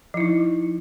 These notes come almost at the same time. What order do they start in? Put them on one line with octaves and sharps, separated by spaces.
F3 E4 D#4